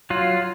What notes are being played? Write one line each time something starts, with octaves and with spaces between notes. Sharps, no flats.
F#3 F4